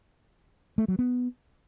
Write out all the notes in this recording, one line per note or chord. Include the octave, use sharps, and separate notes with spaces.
A3
F#3
B3